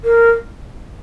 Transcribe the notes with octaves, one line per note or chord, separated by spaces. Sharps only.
A#4